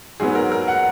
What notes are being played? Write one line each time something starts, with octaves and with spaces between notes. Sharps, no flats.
G#2 F#3 B3 G#4
A#4
A#4
F#5